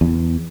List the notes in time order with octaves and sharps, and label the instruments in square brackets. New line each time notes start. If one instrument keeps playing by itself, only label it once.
[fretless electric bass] E2